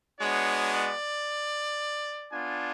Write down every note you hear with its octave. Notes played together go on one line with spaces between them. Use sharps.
G#3 B3 D4 F#4 C#5
D5
B3 D4 F4 G#5